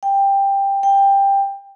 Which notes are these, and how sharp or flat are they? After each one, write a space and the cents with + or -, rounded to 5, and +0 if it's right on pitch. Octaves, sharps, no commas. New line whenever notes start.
G5 +10
G5 +15